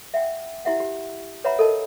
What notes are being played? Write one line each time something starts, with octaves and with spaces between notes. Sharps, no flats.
E5 F#5 G5
E4 G4 E5 F#5
G4
B4 C#5 E5 F#5 A#5 B5
A4 A#4 D#5 A5